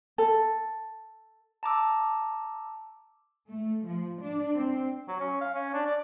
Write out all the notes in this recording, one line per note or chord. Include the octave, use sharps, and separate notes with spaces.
A4
A5 A#5 D6 E6
A3
F3
D4
C4
F#3
C#4
F5
C#4
D4
D5